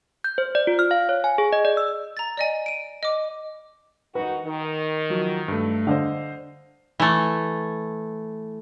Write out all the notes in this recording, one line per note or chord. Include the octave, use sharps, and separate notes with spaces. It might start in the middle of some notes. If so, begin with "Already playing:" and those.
G6
C5
D5
F4
F6
F5
C#5
G#5
G#4
D#5
D5
E6
A#5 A6
D5 D#5 G#5
D7 D#7
D#5 D6
D#3 D#4 F#4 B4
D#3
F3 F#3 F#4
G2 A3
D3 C5 D#5 F5
E3 A3